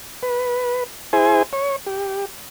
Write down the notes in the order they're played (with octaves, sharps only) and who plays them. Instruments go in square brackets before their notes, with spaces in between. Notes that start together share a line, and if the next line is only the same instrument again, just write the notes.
[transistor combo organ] B4
E4 G#4 C5 G#5
C#5
G4